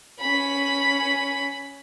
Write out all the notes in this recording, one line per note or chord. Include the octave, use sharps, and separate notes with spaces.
C#4 B5